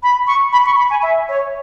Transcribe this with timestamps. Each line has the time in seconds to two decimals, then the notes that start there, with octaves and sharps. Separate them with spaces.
0.03 B5
0.27 C#6
0.53 B5
0.66 C#6
0.78 B5
0.90 G#5
1.03 E5
1.29 C#5